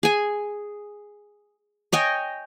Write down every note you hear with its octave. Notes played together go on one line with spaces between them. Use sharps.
G#4 G#5
C#5 D#5 G5 G#5